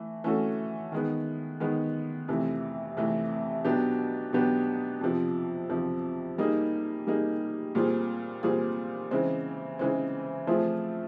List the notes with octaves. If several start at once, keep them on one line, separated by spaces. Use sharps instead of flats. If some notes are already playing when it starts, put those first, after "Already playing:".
Already playing: E3 A3
E3 A3 C#4 F#4 A4
D#3 G#3 B3
D#3 G#3 B3
F2 C3 E3 A3
F2 C3 E3 A3
B2 F#3 B3 D4 G4
B2 F#3 B3 D4 G4
F2 C3 F3
F2 C3 F3
G3 A#3 D#4 G#4
G3 A#3 D#4 G#4
A#2 G3 C4 F4 G#4
A#2 G3 C4 F4 G#4
C#3 E3 G#3 C4
C#3 E3 G#3 C4
F3 A3 C4 F4 G#4